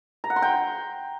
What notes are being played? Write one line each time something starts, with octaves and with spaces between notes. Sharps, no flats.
A#5
F#5
C6
G5